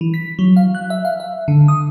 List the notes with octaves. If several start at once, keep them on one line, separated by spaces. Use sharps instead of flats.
E3
B6
F#3
F5
F#6
E5
F5
E5
D3
D#6